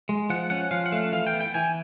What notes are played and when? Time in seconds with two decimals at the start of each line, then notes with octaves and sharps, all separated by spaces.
0.09 G#3
0.30 F3 F#5
0.50 C#4 F#5
0.71 F3 F5
0.86 F#5
0.92 A3 F5
1.12 E3 F5
1.27 G5
1.33 B3
1.41 G5
1.54 E3 G#5